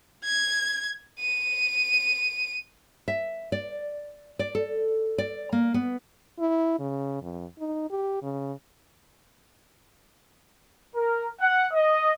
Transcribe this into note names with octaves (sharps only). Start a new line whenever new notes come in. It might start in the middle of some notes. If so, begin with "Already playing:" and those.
G#6
D#7
E5
D5
D5
A4
D5
A#3
B3
E4
C#3
F2
D#4
G4
C#3
A#4
F#5
D#5